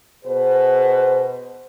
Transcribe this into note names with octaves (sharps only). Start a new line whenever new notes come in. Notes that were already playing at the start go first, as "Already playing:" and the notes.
B2 G#4 B4 C5